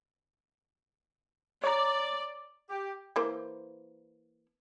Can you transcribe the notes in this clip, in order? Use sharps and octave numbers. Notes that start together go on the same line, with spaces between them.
C#5 D5 A#5
G4
E3 A#3 C5